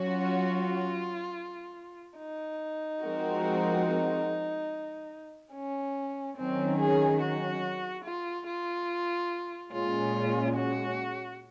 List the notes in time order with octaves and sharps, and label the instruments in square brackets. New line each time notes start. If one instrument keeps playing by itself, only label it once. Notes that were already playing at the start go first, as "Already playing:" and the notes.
Already playing: [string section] F#3 C#4 F#4
[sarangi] F4
D#4
[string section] F3 G#3 C4 F#4 A#4
[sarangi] C#4
[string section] D#3 F#3 C#4 [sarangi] C4
[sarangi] G#4
F#4
F4
F4
[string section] A#2 G#3 C#4 [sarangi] F4
[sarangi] F#4